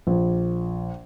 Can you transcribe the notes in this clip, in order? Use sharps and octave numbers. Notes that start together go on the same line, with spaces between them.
A#1